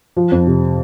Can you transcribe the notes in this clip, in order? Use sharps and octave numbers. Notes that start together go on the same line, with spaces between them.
F3
F2
C3